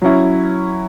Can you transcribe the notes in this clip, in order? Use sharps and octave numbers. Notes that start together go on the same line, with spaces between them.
F#3 C#4 E4